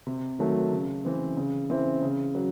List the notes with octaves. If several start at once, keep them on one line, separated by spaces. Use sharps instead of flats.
C3
D#3 F#3 A3
C#3
E3 C4
C#3
E3 C4 E4 C5
C#3
F#3